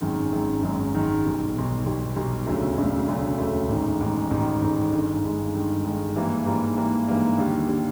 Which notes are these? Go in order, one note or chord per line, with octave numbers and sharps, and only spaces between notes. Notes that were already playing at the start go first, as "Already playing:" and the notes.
G#1 F#2 D#3 G#3
G#1 F#2 D#3 G#3
G#1 F#2 D#3 G#3
G#1 F#2 D#3 G#3
B1 B2 G3
B1 B2 G3
B1 B2 G3
B1 B2 G3
E1 D2 C#3 F#3 A3
E1 D2 C#3 F#3 A3
E1 D2 C#3 F#3 A3
E1 D2 C#3 F#3 A3
A1 G#2 D#3
A1 G#2 D#3
A1 G#2 D#3
A1 G#2 D#3
G1 G2 D#3 G#3
G1 G2 D#3 G#3
G1 G2 D#3 G#3
G1 G2 D#3 G#3
G#2 E3 G3 A#3 D4
G#2 E3 G3 A#3 D4
G#2 E3 G3 A#3 D4
G#2 E3 G3 A#3 D4
D#2 D3 G3
D3 G3